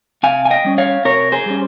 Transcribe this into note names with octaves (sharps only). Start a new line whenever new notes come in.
C3 F5 G#5
G#5
D#5 G5
G3 C#4
C#5 F5
C3 A#4 C#5
G#4 C5
G3 C#4